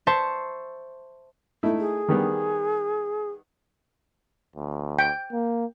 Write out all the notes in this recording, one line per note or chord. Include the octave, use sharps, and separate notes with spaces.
C5 E5 A5 C#6
A3 D#4 E4
G#4
D#3 G3 B3
D2
G5
A#3